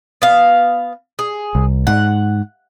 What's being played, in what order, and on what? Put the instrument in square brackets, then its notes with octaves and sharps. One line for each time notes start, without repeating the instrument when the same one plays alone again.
[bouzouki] B3 F5
G#4
[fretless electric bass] C2
[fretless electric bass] G#2 [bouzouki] F#5